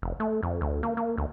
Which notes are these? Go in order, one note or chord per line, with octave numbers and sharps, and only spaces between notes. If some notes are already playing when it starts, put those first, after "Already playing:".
F1
A3
F2
D2
A#3
A#3
D2